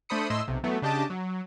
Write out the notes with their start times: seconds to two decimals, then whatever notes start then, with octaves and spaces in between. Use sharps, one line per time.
0.09 A3 D4 C5 B5 D#6 C#7
0.30 A2 E4 D#5 C6 E6
0.48 B1 C3
0.64 E3 F#3 A3 B3
0.82 C#3 D4 G4 D#5 A5 D6
1.10 F#3